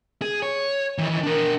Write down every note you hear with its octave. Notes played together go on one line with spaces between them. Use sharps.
G#4
C#5
D#3 E3
D4 A#4